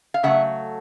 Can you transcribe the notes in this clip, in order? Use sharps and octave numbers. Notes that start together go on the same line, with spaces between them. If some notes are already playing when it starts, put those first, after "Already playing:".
F5
C#3 F#3 A3 E5 F#5